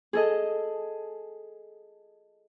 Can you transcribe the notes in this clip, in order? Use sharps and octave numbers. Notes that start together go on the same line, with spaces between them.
G#4 A4 D#5